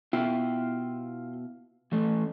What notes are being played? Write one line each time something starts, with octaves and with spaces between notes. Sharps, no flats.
B2 E4 F4 G5
E3 A3